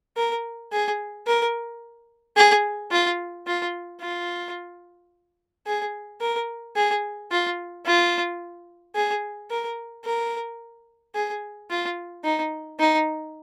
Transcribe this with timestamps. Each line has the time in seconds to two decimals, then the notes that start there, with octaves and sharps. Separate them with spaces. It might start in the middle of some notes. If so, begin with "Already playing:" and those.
0.17 A#4
0.73 G#4
1.27 A#4
2.36 G#4
2.92 F4
3.47 F4
4.01 F4
5.67 G#4
6.21 A#4
6.76 G#4
7.32 F4
7.86 F4
8.96 G#4
9.50 A#4
10.05 A#4
11.15 G#4
11.70 F4
12.24 D#4
12.80 D#4